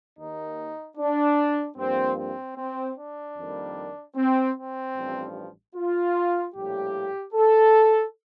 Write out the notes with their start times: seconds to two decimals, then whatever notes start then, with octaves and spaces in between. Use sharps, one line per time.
0.18 D#2 D#3 A#3 D#4
0.97 D4
1.77 G2 F3 A#3 C4
2.17 C4
2.56 C4
2.97 D4
3.36 F2 D#3 G3 A#3
4.16 C4
4.56 C4
4.95 A1 G2 F3
5.75 F4
6.54 A#1 A2 G3 A#3 G4
7.33 A4